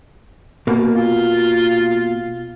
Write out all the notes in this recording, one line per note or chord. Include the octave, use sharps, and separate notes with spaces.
B2 A#3
F4